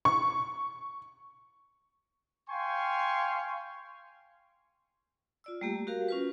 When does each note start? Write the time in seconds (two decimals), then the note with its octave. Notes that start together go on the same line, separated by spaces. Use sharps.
0.05 C#6
2.50 F5 G5 G#5 C6 C#6
5.44 F4 D5 E6
5.61 G3 A3 A#3 G4
5.87 F#4 G4 A#4 F5
6.08 C#4 F4 B4